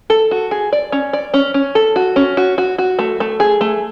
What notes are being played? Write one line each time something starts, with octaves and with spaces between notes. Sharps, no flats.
A4
F#4
G#4
D5
C#4
D5
C#4
C#4
A4
F#4
C#4
F#4
F#4
F#4
A3
A3
G#4
A3